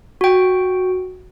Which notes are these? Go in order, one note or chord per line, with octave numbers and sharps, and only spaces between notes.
F#4 G5